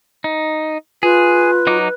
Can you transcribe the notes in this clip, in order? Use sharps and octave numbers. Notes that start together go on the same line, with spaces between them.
D#4
F4 G#4 B4
F#3 D#4 D6